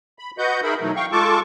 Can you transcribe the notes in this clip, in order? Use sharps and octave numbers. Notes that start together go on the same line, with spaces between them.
B5
F#4 B4 D#5 F#5 G6
D#4 G#4 A#4 E5 B5
B2 E3 F#3 A3 D#4
F5 G5 C#6
G#3 F4 A4 A5 C#6 D6